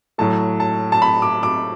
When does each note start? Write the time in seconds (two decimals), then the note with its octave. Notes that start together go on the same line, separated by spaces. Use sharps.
0.18 A2 F#3 A3 A5
0.60 A5
0.92 A5
1.02 B5
1.22 D6
1.43 D6